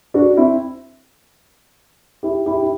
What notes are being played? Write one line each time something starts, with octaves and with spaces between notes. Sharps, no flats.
D4 F#4
C4 E4
E4 G4
E4 G4
E4